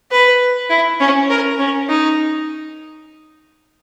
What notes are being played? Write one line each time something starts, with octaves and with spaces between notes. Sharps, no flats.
B4
E4
C#4
A#4
C#4
D#4